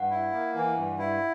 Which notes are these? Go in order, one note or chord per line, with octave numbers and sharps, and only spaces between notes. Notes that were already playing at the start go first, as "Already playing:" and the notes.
Already playing: G2 F#5
E4
A#3
E3
G2
E4